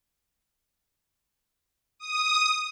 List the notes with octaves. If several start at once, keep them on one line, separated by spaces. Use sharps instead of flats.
D#6